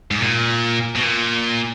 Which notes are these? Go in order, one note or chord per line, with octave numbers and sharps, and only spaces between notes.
G#2
A#2
B2
A#2